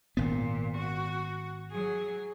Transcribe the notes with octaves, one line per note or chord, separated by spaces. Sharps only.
G#1 A#2 B3
F#4
F#3 G#4